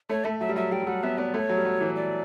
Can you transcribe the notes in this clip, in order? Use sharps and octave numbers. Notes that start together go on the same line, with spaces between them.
A3 C#5
A3 E5
F#3 E5
G3
F#3 E5
G3 G5
F#3
G3 F#5
B3 E5
B3 D5
A3 C#5
F#3
G3
F#3
E3
D5